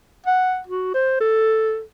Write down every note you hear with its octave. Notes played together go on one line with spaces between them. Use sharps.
F#5
F#4
C5
A4